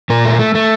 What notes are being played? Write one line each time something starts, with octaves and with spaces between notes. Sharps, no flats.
A#2 A#4
A3
A3
A3